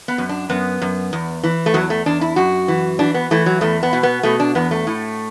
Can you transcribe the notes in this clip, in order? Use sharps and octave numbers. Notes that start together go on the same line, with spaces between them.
B3
F#2
D4
F#2 B3
F#2
E2
E3
A3
E2 F#3
A3
E2 D4
E4
F#2 F#4
E3
E3 D4
B3
E3 A3
F#3
E2 A3
B3
B2
B3
B2 A3
D4
E2 B3
A3
A2